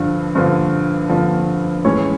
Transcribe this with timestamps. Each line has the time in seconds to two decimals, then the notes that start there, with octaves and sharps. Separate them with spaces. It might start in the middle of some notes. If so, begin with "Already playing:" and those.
Already playing: G2 D3 F3
0.35 G2 D3 F3 C5
1.10 G2 D3 F3
1.84 A2 E3 G#3 C#4 C#5